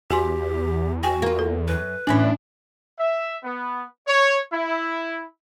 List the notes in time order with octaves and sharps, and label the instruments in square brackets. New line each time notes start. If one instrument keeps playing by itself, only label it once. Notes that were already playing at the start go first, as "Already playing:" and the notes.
[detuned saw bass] E2 [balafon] F#4 G#5 C6 [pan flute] G4
[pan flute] F#4 [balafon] G5 G#5
[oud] A#3 F4
[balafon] A4
[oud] F#2 [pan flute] B4
[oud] E2 A2 E3 [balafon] C#4 G#5 [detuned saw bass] D4
[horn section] E5
B3
C#5
E4